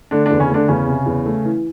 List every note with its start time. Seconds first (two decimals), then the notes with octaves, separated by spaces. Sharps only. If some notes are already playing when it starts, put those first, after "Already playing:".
0.11 D3 A3 D4
0.26 E2 D3 D4
0.40 C#3 C#4
0.50 D3 A3 D4
0.68 E2 C#3 C#4
0.87 C3
1.06 E2
1.26 A3
1.44 E3